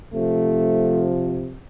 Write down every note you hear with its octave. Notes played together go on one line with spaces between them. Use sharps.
C3 F3 A3